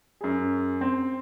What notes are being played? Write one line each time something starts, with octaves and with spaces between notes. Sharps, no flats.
F#2 G#4
C4